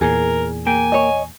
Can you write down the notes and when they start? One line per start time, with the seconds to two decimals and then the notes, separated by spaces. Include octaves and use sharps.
0.01 E2 A#2 G#4 A#4
0.67 A#3 G5 G#5
0.92 C#5 D#5